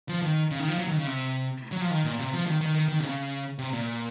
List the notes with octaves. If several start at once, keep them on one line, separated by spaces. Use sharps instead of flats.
F3
D#3
C#3
D#3
F3
F#3
D#3
C#3
C3
F#3
F3
D#3
A#2
C3
F3
D#3
D#3
D#3
D#3
C3
C#3
C3
A#2